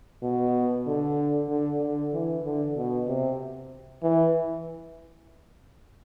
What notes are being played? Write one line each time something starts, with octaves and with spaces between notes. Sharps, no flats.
B2
D3
D3
D3
E3
D3
B2
C3
E3